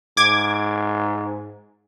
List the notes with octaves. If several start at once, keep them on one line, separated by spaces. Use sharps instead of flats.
G#2 D6 G#6